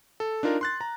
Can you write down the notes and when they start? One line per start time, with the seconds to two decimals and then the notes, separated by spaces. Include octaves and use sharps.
0.20 A4
0.43 D4 D#4 F4 A#4
0.61 C6 F#6 A6
0.81 A#5